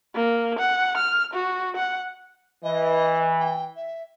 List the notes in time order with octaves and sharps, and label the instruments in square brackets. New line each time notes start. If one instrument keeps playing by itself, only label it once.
[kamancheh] A#3
F#5
F6
F#4
F#5
[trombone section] E3 [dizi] D#5
[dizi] G5
E5